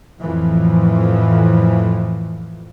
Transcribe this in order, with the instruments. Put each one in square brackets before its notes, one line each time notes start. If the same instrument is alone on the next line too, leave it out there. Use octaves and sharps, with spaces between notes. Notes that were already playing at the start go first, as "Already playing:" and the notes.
[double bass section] F2 A2 E3 F3